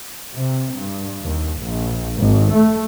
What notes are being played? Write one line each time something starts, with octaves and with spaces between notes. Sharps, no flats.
C3
G2
D#2
A#1
G#1
A3